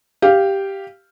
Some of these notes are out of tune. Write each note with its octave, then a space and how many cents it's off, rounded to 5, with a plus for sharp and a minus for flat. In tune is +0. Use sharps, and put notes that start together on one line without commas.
G4 +0 F5 -10